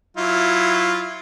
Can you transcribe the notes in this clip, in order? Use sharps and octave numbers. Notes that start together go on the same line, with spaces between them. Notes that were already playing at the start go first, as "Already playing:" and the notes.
F#3 E4 F4